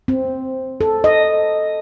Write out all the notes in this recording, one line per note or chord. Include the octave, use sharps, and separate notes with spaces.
C4
A4
D#5